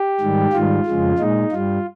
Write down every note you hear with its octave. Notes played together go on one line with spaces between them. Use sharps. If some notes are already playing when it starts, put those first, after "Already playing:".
Already playing: G4
G#2 D#3 G3
G#2 D#3 G3 F4
F2 C#3 F3 G#3
A#2 G#3 D#4
G2 G3 F4